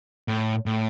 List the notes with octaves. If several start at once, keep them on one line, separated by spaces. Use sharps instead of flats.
A2
A2